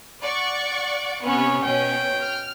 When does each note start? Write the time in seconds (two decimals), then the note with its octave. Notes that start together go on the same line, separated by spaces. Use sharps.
0.23 D5 F#5 C#6
1.24 C3 B3 C#4 C#5
1.64 B2 C#4 G5
2.21 F6